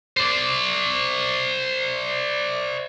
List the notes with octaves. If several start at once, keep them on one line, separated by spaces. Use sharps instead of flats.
C5 D5